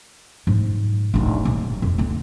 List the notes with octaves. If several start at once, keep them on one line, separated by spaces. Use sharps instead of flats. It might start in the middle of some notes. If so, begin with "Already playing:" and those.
G#2 F3
D1 D#4
D#1
F2
D3 B3